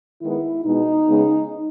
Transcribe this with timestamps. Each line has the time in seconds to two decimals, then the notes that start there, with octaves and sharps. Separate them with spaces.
0.21 D#3 G#3 B3 E4
0.65 B2 G#3 B3 D#4
1.08 C#3 G#3 B3